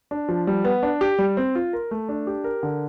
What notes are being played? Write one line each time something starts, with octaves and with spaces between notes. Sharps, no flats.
D4
F3
G3
B3
D4
G4
G3
C4
F4
A#4
A3
D4
G4
A#4
D3